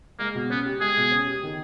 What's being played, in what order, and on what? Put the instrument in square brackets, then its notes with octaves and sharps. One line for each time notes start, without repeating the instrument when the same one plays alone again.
[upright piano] G#3 [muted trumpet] A#3
[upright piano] B2
[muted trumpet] B3 [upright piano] C#4
[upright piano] G4
[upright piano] G#3 [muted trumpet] G#4
[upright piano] B2
C#4
G4
D#3